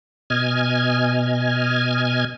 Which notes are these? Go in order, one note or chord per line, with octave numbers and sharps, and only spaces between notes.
B2 D#5 G#5 F6 G#6